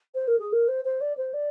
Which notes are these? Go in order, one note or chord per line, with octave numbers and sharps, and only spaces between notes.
C5
A#4
G#4
A#4
C5
C5
D5
C5
D5